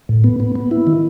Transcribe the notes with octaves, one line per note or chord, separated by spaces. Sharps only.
A2
B3
B3
B3
E4
D#3